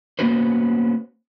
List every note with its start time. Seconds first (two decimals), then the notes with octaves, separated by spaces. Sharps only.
0.19 A#3 B3 C#4 F#4 B4 C5